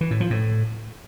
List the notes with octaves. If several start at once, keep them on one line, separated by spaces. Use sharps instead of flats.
E3
A2
F3
A2